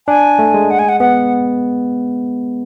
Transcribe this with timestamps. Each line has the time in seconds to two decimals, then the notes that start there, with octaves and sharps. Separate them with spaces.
0.08 D4 G#5
0.39 A3
0.54 G#3
0.70 F#5
0.79 G#5
0.89 F#5
1.00 B3 F#5